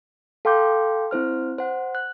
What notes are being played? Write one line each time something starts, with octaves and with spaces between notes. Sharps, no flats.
A4 F5 G5 C6 D6 G6
C4 E4 C5 F6
C5 F#5
F#6